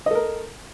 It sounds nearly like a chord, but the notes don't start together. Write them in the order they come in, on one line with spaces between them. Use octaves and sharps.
D#5 A4 A#4